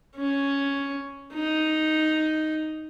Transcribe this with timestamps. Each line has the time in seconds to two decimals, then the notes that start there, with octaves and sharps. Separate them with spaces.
0.17 C#4
1.33 D#4